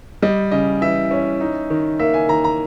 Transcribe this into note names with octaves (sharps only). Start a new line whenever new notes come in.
G3 D#5
C#3 D#5
E3 E5
C#4
D#4
D#3
A#3 E5
G#5
D#3 A#5
A#5